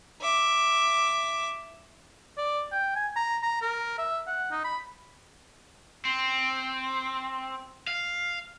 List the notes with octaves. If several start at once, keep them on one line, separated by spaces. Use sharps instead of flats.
E5 D6
D5
G5
G#5
A#5
A#5
A#4
E5
F#5
D#4
B5
C4
F5